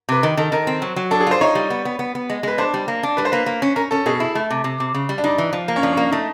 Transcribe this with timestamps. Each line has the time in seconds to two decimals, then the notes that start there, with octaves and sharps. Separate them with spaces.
0.09 C3 B4
0.22 D#3 A#4
0.37 D#3 A4
0.52 D#3 A#4
0.67 C4
0.82 F#3
0.96 F#3
1.11 D4 A4
1.21 G#4
1.27 F4 C5
1.41 D#4 C#5
1.55 G3
1.70 B3
1.85 B3
1.99 B3
2.15 B3
2.30 G#3
2.43 G#3 B4
2.58 D4 C5
2.74 G3
2.88 A#3
3.03 D4
3.17 G3 B4
3.25 C5
3.32 A#3 B4
3.46 A#3
3.62 C#4
3.76 C#4 A#4
3.91 C#4 A4
4.06 B2 G#4
4.20 E4
4.35 A3
4.50 C3
4.64 C3
4.80 C3
4.94 C#3
5.09 G3
5.18 D4
5.24 G3 D#4
5.38 E3
5.53 F3
5.68 A#3
5.76 C#4
5.83 F3 D4
5.93 C#4
5.97 A#3
6.02 D4
6.12 A3 D#4